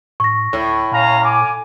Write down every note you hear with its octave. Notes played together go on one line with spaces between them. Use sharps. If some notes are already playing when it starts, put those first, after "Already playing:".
A2 C#6 A#6
D2 A2
A#2 C#4 F5 A#5
G#5 D6